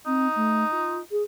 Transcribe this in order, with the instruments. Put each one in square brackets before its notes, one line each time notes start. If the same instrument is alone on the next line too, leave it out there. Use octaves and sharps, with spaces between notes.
[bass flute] C4 [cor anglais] D#4
[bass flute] A3
F4
G#4